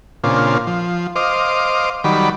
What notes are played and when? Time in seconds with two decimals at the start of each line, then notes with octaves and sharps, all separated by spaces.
0.24 A#2 C#3 C4 D4 F4
0.67 F3
1.16 C5 D#5 F5 D6
2.04 D#3 F#3 G3 D5 B5